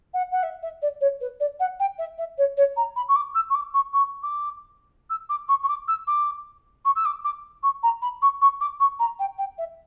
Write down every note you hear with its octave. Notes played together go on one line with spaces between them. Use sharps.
F#5
F#5
E5
E5
D5
C#5
B4
D5
F#5
G5
E5
E5
C#5
C#5
A#5
B5
C#6
D6
E6
C#6
D6
C#6
C#6
D6
E6
D6
C#6
C#6
D6
E6
D6
C#6
E6
D6
D6
C#6
A#5
B5
C#6
C#6
D6
C#6
A#5
G5
G5
E5